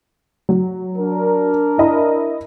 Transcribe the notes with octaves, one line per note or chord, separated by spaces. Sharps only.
F#3
D4 A#4
E4 D#5 B5